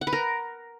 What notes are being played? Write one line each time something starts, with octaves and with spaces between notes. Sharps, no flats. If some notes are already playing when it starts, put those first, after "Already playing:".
F#5
B4
A#4